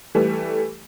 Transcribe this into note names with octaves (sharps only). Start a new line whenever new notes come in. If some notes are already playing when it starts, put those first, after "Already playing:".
E3 G3 A3